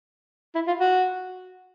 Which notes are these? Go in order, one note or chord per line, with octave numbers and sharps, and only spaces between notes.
E4
F4
F#4